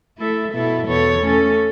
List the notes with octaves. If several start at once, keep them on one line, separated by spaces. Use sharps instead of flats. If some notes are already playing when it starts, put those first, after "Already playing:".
A3 E4 A4 E5
B2 B3 E4 A4 E5
E2 B2 B3 A4 C#5
A3 C#4 A4